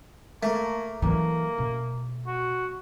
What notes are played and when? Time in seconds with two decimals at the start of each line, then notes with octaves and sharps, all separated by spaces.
0.43 A3 A#3
1.02 E3 F#3 A#3
1.58 B2
2.27 F#4